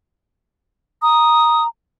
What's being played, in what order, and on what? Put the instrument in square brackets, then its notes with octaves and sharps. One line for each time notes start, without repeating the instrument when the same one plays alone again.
[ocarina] A#5 [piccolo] D#6